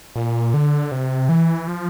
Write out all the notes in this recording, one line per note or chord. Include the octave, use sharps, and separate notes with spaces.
A#2
D3
C3
E3
F3